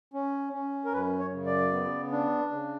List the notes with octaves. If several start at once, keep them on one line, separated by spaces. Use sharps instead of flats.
C#4
C#4
A#4
F#2 B4
C#5
C#3
D5
B3
D4
C#3